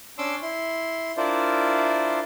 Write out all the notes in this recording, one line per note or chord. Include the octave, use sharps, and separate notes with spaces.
C#4 D4 C6 D6 E6
E4 C6
D4 E4 F4 A#4 C5 D5